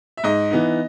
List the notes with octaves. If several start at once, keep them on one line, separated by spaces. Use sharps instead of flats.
E5
G#2 D#5
E3 B3 D#4